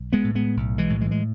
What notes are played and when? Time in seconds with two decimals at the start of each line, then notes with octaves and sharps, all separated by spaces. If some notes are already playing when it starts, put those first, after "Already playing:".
Already playing: B1
0.13 G#3 B3
0.24 A2
0.35 G#3 B3
0.57 B1
0.78 E3 G#3
0.90 A2
1.01 E3 G#3
1.11 G#3